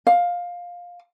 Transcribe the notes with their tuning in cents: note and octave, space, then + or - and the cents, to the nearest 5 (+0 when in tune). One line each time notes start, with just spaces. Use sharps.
F5 +15